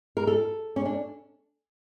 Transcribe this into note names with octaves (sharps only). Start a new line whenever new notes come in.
A#4
A4
C#4
D4